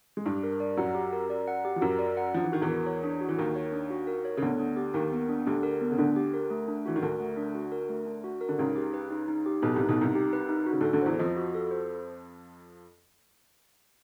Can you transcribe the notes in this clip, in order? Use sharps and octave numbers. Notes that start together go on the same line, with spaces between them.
G#3
G2 G3 G4
A#4
D5
F#2 F#3 F#5
G4
A#4
D5
F#5
G4
F3
F#2 F#3 A#4
D5
F#5
F3 D4
E3
D#3 F#4
E2 E3
A#4
C#5
D4
F#4
E3
D#2 D#3 A#4
C#5
D4
F#4
A#4
C#5
C#3
D2 D3 B3
D4
G4
D#2 D#3 A#4
B3
D4
D2 D3 G4
A#4
B3
C#3
D2 D3 D4
G4
A#4
A3
D4
E3 F#4
D#3
D2 D3 A#4
A3
D4
F#4
A#4
A3
D4
F#4
A#4
D3
C#2 C#3 D#4
G4
B4
D#4
D#4
G4
B1 B2 B4
C2 C3 D#4
B1 B2
C2 C3 D#4
G4
B4
D#4
F#4
C#3
D2 D3 A4
D2 D3
E2 E3 C5
F2 F3 D#5
F#4
A4
C5